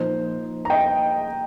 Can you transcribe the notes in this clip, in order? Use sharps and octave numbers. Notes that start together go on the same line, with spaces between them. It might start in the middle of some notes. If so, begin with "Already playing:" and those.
Already playing: A#2 F3 A#3 D#4 C5
A#5
D#5 G5